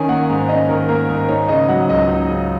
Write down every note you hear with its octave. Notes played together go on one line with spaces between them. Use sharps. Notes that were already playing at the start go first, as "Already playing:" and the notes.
Already playing: D#3 C#4 G#5
A#3 F#5
G#2
C#4 D#5
D#3 A#4
A#3 A#4
G#2 A#4
D#4 C#5
C#3 D#5
F#3 F#5
C#2 D#5
D#4
C#3